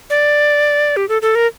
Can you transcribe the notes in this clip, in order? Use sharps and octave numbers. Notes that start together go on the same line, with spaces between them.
D5
G4
A4
A4
A#4